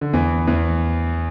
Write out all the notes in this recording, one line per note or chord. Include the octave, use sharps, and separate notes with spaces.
D3
E2 E3
E2 E3